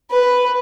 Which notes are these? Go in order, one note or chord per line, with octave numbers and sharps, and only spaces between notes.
B4